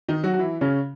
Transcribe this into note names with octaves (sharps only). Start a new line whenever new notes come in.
D#3 D#4
F#3 F#4
F#4
E3 E4
C#3 C#4